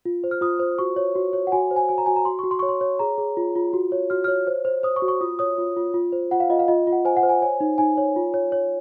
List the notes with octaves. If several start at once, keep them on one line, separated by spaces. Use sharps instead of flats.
F4
C5
F6
F4 D#6
C5
F#4 C#6
C#5
F#4
C#5
F#5
F#4 G#5
C5
G#5
F#4 G#5
A#5
F#4 G#5
A#5
F#4 C6
C#6
F#4
C6
C#5 C#6
C6
C#5
G#4 A#5
G#4
F4
F4
F#4
C#5
F#4 F6
C#5 F6
C5
C5
C5 D#6
C#6
F#4
C#6
F4 D#6
C#5 D#6
F4
F4
F4
C5
F4 F#5
F5
F4 D#5
F5
F4 D#5
F4
F#5
C5 G#5
F#5
C5
G#5
C#5 G#5
D#4
D#4 G#5
C#5
F4
C#5
C#5